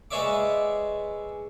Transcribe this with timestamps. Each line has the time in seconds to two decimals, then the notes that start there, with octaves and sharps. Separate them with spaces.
0.11 G#3 B4 C#5 D5 E5 D6